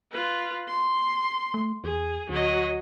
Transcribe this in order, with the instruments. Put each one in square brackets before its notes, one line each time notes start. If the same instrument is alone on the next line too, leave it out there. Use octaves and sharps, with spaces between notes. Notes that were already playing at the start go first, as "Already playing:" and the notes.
[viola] F4 B4
C6
[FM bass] A3
[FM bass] E2 [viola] G#4
[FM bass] D2 [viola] F#3 D#5